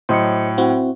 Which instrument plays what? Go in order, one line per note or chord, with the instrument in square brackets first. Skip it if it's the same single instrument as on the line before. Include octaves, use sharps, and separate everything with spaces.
[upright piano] A2 F#3 [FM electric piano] C5 D#5 C#7
[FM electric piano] C4 E4 F#4